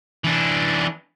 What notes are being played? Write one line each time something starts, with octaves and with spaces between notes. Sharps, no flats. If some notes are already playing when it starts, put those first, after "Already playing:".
E3 D4